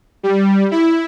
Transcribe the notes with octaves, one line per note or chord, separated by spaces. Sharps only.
G3
E4